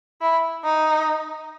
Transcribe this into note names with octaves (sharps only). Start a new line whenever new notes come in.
E4
D#4